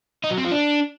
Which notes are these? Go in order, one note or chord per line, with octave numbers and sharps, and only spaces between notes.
D#4
F#3
C4
F3
D4